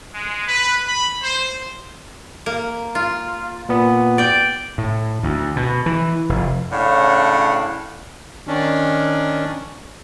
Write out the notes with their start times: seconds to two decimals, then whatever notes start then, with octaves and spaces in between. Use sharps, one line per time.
0.14 G#3
0.46 B4
0.87 B5
1.22 C5
2.46 A#3
2.95 F4
3.69 A#2 B3
4.18 D5 G5
4.78 A2
5.23 D2
5.56 B2
5.86 E3
6.29 F1
6.71 A2 C#3 D4 F5 F#5
8.47 D#3 C#4 D4